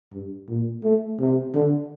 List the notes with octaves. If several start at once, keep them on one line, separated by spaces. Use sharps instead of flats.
G2
A#2
A3
C3
D3